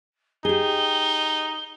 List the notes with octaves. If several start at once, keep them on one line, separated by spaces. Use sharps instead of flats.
D#4 G4 G#4 G7